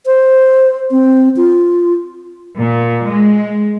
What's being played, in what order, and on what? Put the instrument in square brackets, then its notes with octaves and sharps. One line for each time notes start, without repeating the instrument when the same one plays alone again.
[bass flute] C5
C4
F4
[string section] A#2
G#3